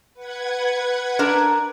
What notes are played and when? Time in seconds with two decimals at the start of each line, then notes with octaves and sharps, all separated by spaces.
0.14 B4 F#5 G#6
1.19 D4 A#4